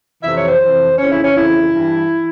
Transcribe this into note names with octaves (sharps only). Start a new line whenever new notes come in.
F2 C3 E3 E5
C#5
C5
F2 C3 E3
F2 C#3 E3 C#4
E4
C#4
F2 C#3 E3 E4
G2 E3
E3